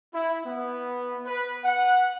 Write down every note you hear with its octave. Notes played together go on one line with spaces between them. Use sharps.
E4
B3
B4
F#5